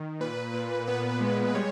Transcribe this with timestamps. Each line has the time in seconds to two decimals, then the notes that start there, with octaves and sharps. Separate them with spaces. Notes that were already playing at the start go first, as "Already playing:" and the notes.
Already playing: D#3
0.20 A#2 B4
0.54 A#2
0.87 B3 B4
1.21 G#3
1.54 G3 C#5